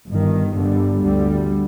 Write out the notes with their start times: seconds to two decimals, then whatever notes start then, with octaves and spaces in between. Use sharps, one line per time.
0.09 G1 G2 D#3
0.55 G1 G2 D3 G3
1.03 D2 D3 G3